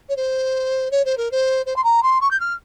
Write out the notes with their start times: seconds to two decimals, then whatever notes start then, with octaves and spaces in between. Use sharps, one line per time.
0.09 C#5
0.16 C5
0.91 C#5
1.05 C5
1.17 A#4
1.31 C5
1.66 C5
1.76 C6
1.83 A#5
2.02 C6
2.21 C#6
2.30 G6
2.40 F6